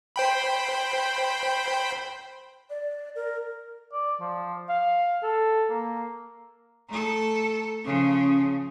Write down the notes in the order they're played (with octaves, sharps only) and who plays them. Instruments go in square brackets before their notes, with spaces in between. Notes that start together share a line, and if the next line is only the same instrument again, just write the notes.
[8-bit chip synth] C5 G5 B5
[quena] D5
A#4
[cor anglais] D5
F3
F5
A4
A#3
[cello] A3 A4 [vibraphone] A#5
[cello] C#3 F3 [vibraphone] C#4